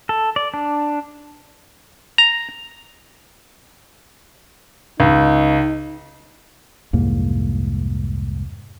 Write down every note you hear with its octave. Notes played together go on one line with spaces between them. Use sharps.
A4
D5
D4
A#5
C#2 D#4
C2 F2 G#2 A#3